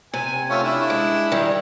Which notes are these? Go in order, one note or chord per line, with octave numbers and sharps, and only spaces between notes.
C3 G#5
A3 C#4 F4
D4 E4
G#3
D#3 G3